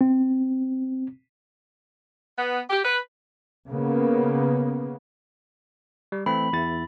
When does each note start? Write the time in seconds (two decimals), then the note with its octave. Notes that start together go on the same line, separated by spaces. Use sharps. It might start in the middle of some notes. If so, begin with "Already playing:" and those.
0.01 C4
2.38 B3
2.70 G4
2.85 B4
3.69 C#3 A#3 B3
6.12 G3
6.26 E3 A3 C4 B5
6.53 E2 E4 A6